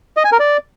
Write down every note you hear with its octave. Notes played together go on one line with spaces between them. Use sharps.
D#5
G#5
A#4
D5